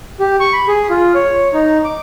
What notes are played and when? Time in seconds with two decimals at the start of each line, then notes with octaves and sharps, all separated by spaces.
0.20 G4
0.40 C#6
0.53 B5
0.68 G#4
0.90 F4
1.15 C#5
1.53 D#4
1.84 D6